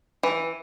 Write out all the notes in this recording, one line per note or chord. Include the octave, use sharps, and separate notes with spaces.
E3